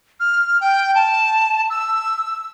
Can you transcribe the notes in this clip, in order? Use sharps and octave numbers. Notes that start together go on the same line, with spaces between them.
F6
G5
A5
E6